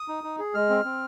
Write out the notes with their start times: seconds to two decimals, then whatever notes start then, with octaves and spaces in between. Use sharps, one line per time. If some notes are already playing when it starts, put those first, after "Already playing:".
Already playing: D#6
0.08 D#4
0.24 D#4
0.39 G#4
0.54 G#3 F6
0.70 C4
0.85 C4